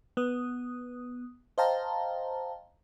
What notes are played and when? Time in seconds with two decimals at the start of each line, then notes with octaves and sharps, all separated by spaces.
0.17 B3 D#6
1.58 C5 D#5 F5 G5 A5 A#5